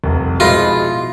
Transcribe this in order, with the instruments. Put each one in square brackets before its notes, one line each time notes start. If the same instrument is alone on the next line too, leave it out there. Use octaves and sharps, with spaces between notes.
[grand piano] F1 C2
[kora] B2 E4 F5 [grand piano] F3 G#3 A#6 [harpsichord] F4